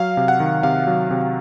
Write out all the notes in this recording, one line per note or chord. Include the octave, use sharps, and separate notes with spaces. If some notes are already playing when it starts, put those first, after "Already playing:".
Already playing: F#3 F5
C3
F#5
D#3
C3 F5
F#3
C3